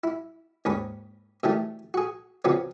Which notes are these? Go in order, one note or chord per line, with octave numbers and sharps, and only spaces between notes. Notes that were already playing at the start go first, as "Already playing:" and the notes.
E4
D#2 G#2 C#4 B5
B2 D#3 E3 G3 A3
F#4 G#4
C#3 F3 F#3 B3 C4